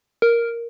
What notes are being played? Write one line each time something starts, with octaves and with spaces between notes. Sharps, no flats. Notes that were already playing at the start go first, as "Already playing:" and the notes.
A#4